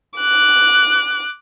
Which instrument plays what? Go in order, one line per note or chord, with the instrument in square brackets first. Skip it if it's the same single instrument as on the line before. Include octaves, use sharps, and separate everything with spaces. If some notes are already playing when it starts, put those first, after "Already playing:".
[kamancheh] D6 F#6